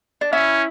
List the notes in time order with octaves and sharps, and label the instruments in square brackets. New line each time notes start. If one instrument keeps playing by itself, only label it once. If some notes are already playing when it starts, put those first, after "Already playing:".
[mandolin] D4
[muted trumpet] C#4 [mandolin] E4